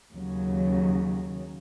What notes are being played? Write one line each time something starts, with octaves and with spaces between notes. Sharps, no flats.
D#2 C#3 F#3